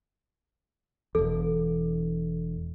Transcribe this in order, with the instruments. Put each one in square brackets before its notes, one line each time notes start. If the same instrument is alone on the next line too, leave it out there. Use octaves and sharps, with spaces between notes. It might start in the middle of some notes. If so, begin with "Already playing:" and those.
[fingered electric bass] E1 E2 [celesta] A4